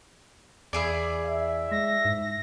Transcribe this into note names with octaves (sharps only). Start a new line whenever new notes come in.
E2 E4 G#4 D5
E5
G#3 A#6
G#2